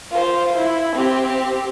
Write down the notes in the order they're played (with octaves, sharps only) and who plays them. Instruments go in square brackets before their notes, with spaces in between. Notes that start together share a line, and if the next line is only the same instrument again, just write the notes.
[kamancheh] F4 C5
E4
C4 G4